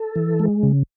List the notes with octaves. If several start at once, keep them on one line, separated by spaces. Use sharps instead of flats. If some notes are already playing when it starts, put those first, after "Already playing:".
Already playing: A4
E3
G#3
C#3